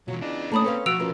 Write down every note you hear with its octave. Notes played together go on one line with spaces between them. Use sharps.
B2 E3 F#3 F4
E2 C#4 D4 D#5
A3 A#3 C#4 G#4 C#5 A#5 B5 D#6
C4 C#4 A4 B4 F5
B1 F3 F#4 E6 D7 F7
F#2 F4 A#4 B4